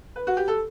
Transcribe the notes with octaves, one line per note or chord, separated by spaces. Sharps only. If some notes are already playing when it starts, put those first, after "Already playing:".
B4
F#4
G4
A4